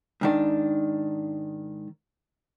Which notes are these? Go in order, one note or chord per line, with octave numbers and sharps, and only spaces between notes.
G#2 D#3 D4